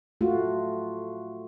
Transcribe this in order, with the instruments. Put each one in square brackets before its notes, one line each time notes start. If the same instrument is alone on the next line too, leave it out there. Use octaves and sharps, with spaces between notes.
[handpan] A3 F4 F#4